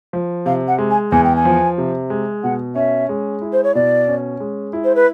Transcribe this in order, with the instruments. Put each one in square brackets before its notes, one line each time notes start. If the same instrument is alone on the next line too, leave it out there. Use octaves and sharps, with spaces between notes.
[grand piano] F3
[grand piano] C3 [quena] F5
[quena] F#5
[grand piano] G#3
[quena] G#5
[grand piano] E2 [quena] G#5
[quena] G5
G#5
[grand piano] F3
C3
G#3
[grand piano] B2 [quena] F#5
[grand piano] C#4 [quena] E5
[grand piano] G#3
E4
[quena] C5
C#5
[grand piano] B2 [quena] D5
[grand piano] C#4
G#3
E4
[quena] C5
B4